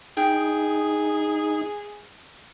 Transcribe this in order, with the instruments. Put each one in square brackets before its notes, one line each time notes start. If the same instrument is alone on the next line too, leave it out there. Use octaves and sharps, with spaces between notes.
[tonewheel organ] D#4 [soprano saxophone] G#4 [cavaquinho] G5